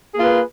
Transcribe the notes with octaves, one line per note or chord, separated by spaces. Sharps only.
A#3 F4 G#4 B4